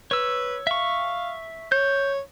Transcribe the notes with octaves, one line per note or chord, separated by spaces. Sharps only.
B4 C#5 E6
E5 F5 C#6
C#5 G6